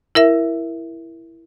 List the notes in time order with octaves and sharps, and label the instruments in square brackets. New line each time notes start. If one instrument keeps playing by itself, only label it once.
[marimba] E4 A#4 E5